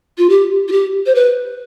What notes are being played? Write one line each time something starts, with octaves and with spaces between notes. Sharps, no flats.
F4
G4
F4
G4
C5
B4